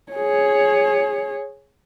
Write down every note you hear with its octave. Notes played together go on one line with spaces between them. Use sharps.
G#4 C#5